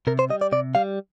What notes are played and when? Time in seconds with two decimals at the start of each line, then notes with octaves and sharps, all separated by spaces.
0.07 C3 A#4
0.19 C5
0.30 G3 D#5
0.41 D5
0.52 C3 D5
0.75 G3 F5